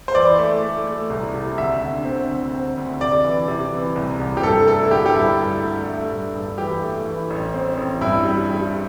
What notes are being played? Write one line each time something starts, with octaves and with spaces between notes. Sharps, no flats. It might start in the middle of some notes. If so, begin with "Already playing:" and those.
C5
E3 D5
A3
A3
A3
C2
C3
D2 E5
D3
C4
D2
C4
D2
C3 D5
E3
C3
E3
C2
C2
G4
G2 A4
A3 A4
E4
D3 G4
G4
G2 E4
G2
A3
A3
G2
G2
E3 G4
A3
E3
A1
C4
A1
G2 E4
G3
G3